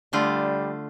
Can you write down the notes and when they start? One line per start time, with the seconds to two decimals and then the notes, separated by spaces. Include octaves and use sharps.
0.13 D3 G3 A3 F4